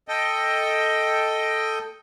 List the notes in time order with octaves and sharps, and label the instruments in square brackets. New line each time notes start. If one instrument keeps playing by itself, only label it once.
[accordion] A4 D#5 G5